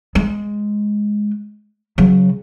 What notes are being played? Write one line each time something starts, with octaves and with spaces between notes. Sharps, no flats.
G#3
C#3 F#3